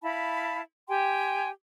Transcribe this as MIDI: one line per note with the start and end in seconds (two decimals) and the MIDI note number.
0.02 0.60 64
0.02 0.60 77
0.02 0.60 81
0.02 0.60 83
0.88 1.49 67
0.88 1.49 79
0.88 1.49 80
0.88 1.49 84